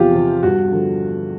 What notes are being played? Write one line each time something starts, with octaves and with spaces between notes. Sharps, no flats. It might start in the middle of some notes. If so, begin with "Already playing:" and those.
Already playing: E2 C3 F3 F4 G4
C3 F3
G2 F#4
D3 F3